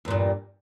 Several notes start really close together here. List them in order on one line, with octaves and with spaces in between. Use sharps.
E2 A#2 G2